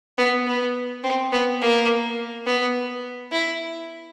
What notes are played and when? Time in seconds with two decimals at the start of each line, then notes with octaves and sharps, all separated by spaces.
0.18 B3
0.47 B3
1.04 C4
1.32 B3
1.61 A#3
2.46 B3
3.32 E4